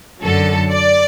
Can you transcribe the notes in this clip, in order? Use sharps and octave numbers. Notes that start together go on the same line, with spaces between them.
F#2 D3 F#3 A4
D5